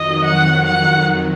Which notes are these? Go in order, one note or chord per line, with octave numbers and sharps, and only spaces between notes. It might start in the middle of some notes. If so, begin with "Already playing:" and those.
Already playing: F2 D#3 F#3 D#5
F#5
F#5